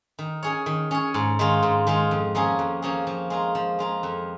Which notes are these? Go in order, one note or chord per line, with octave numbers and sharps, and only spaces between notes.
D#3
C#4 G#4 C#5
D#3
C#4 G#4 C#5
G#2
D#3 G#3 F4
G#2
D#3 G#3 F4
F2
F3 A#3 C#4 G#4
F2
F3 A#3 C#4 G#4
F3
G#3 F4 A#4
F3
G#3 F4 A#4
F2